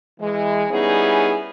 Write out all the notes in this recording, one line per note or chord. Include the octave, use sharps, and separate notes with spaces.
E3 G#3
G3 B3 C#4 D#4 E4 G#4